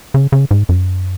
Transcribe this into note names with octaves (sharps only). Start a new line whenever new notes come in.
C#3
C#3
G#2
F#2